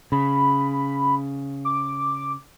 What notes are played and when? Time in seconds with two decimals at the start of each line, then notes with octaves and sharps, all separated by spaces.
0.12 C#3 B5
1.65 D6